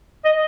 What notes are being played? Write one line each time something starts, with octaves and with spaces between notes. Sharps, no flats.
D#5